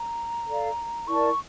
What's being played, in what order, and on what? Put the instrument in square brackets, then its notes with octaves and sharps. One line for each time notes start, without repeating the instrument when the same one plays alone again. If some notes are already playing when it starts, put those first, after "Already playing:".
Already playing: [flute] A#5
[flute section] A4 D5 F5
[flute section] E4 A#4 D5 A5 [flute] C#6